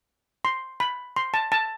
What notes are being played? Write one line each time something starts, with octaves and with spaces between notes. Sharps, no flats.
C6
B5
C6
A5
A5